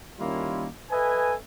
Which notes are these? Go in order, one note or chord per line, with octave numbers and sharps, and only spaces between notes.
D#3 G3 A#3 C#4 E4 F4
A4 B4 D#5 E5 G#5